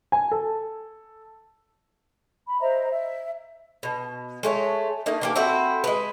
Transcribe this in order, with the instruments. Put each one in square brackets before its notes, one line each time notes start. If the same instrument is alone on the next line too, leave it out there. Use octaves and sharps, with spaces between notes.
[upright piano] G#5
A4
[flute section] B5
C5 D#5 E5 A#5
E5
[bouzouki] B2
G#3 A3 C#5
A3 A#3 D#4
E3 A#3 G4
C4 E4 F#4 A4
G#3 B4